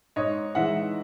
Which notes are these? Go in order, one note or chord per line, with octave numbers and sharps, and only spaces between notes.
G#2 C#5 D#5
E3 G#3 E5 F#5